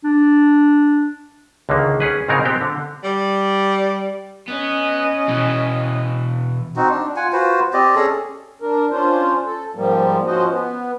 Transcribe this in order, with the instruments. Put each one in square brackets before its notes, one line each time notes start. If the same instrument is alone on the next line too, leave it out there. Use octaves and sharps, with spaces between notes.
[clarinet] D4
[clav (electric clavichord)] C#2 D3 D#3 A#3
C#4 G#4 B4
G#2 C#3 G#3 C4 D#4 A#4
B3 C4 G4 G5
D3
[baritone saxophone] G3
[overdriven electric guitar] B3 [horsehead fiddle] C#4 D#5
[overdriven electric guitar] B2 E3
[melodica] C4 D#4 F#4
D4
F4 F#5 G#5
F4 F#4 B4 C5
C4 G4 D5 D#5
C#4 G#4 A4
[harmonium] D4 A#4
C#4 D4 F4 C5
A4
G#2 F3 G3 A#3
F3 C#4 F#4 C5 D#5
B3